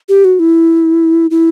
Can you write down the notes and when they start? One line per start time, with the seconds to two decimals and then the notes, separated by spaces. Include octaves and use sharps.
0.09 G4
0.25 F#4
0.39 E4
1.31 E4